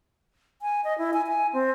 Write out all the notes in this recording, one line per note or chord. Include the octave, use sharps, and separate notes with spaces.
G#5
D#5
E4
G#5
G#5
C4